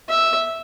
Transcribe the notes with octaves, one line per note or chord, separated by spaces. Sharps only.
E5